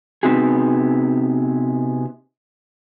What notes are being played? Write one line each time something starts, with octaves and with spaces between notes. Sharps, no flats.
C3 B3 C4 D#4 F#4 G#4